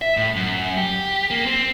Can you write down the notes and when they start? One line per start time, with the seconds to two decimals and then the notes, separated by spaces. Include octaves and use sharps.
0.02 E5
0.17 A2
0.36 F#2
0.77 G4
1.30 A#3
1.46 C4